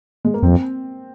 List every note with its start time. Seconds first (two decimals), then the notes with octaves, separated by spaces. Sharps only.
0.25 G#3
0.34 A#3
0.43 F2 C4